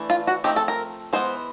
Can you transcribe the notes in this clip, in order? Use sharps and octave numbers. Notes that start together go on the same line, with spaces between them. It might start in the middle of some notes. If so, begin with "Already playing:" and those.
Already playing: E3 A3 D4
F4
F#4
F3 A3 C4 D#4 G4
A4
A#4
E3 G#3 B3 C5